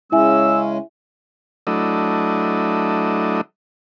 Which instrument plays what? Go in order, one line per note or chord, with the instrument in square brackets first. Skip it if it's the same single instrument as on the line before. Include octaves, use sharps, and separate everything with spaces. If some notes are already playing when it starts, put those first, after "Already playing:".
[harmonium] C#3 G#3 C#4 [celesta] E4 E5 G#5 [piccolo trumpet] E6
[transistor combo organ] F#3 A3 D4 E4 D#5